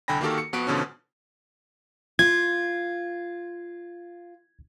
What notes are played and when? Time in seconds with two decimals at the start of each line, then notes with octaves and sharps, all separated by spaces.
0.08 C2 D3 G5 G#5 B5 A#6
0.21 D#3 A#3 F#4 G4 A4 A#4
0.38 C#7
0.53 F2 B3 F#4 B4 D7
0.67 G#2 B2 D3 F3 C#4
2.19 F4 G#6